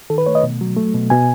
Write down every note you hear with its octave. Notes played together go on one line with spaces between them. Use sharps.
D#3 A4
B4
A3 C#5
D#5
B2
F#3
A3
B2
B2 G#5